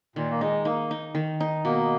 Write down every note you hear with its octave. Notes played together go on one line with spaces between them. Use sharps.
A#2 D#3
A#3
G#3 D#4
A#3 D#4
D#4
D#3
D#4
B2 A#3